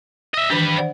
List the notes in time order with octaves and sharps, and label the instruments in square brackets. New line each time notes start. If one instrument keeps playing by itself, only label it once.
[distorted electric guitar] D#5 E5
[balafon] D#3 E3 D4 [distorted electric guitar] G4 B4
[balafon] C5 D5 F#5